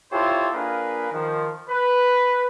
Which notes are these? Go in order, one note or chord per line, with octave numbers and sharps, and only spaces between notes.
E4 F4 G4 A4 C5 C#5
A#3 D4 F4 G#4 A#4 B4
D#3 F3
B4